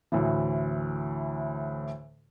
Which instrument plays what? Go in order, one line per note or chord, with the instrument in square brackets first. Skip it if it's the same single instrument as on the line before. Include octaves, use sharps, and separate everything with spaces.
[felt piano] D2 A2 E3